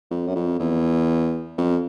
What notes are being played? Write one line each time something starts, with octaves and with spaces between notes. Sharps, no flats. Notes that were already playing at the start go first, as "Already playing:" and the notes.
F2
F#2
F2
E2
F2